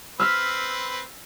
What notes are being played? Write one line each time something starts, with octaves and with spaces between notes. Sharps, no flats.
C4 B4 E6 F6 B6